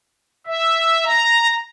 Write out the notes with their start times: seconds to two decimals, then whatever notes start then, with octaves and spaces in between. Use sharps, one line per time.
0.47 E5
1.05 A#5